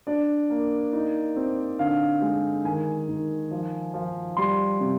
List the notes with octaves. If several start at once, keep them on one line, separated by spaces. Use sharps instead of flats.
D4 D5
A#3
D#4
C4
D3 F5
G#3
D#3 G#5
D#3
F3
F3
G3 C6
C3